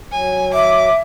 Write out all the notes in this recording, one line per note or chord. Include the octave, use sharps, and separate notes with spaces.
F#3 G#5
E5 D6